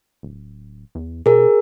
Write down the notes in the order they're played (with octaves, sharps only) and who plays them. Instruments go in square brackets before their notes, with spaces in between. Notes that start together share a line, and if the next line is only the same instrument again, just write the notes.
[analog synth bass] D1
E2
[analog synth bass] B2 [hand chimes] G#4 A#4